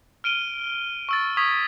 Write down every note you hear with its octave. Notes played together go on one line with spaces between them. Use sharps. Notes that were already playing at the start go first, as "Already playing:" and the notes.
F6 D7 D#7 G7
C#6 E6 A6
C#6 D#6 G#6 B6